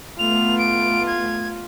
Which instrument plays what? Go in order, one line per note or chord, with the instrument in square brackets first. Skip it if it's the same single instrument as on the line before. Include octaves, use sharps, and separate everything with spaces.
[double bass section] A3 B3 [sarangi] F4 [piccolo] F7
[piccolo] D7
G#6